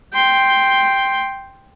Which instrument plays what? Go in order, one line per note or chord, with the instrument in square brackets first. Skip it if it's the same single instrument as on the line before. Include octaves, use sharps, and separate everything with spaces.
[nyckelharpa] G5 C6